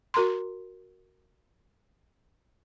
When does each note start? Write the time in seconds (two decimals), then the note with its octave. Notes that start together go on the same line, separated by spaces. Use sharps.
0.14 F#4 A#4 A#5 C6